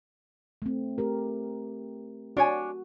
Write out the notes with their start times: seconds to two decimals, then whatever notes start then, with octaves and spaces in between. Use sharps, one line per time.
0.62 A3 C4
0.98 A3 G4 A#4
2.37 D4 F#4 C#5 G#5